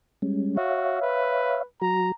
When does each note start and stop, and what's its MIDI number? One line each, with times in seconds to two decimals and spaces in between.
0.22 0.57 55
0.22 0.57 56
0.22 0.57 61
0.57 1.02 66
0.57 1.63 73
0.57 1.63 76
0.57 1.63 77
1.02 1.65 71
1.82 2.12 54
1.82 2.12 66
1.82 2.13 82